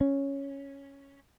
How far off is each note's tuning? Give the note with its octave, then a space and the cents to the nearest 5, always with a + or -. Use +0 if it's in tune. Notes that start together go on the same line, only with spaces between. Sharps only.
C#4 +0